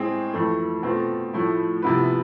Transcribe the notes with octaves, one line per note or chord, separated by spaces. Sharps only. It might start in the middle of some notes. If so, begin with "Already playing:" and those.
Already playing: A2 G#3 C4 G#4
F2 E3 A3
B2 A3 C4 F4
A2 F3 A3 E4
C3 F3 B3 E4 B4